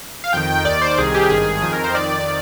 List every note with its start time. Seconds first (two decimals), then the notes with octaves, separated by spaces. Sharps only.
0.24 F5
0.33 F2 D#3 G5
0.50 G5
0.65 D#2 D#3 D5
0.82 C5
0.98 C2 C3 D#3 G#4
1.15 G4
1.30 G#1 G2 D#3 G#4
1.62 F2 D#3 G#4
1.73 A#4
1.84 C5
1.94 F2 D#3 D5
2.10 D5